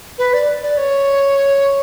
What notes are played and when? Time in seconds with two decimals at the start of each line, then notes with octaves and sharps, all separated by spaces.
0.18 B4
0.34 D5
0.63 D5
0.77 C#5